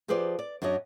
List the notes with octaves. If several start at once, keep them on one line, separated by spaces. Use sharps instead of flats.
F3 G4 G#4 B4 C5 D5
D5
F#2 D4 F#4 C#5 D#5